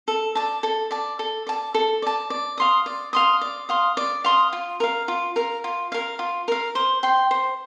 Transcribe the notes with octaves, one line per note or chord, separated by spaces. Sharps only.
A4
D5 A5
A4
D5 A5
A4
D5 A5
A4
D5 A5
D5
F5 C6 D#6
D5
F5 C6 D#6
D5
F5 C6 D#6
D5
F5 C6 D#6
F4
A#4 F5
F4
A#4 F5
F4
A#4 F5
F4
A#4 F5
C5
G5 C6
C5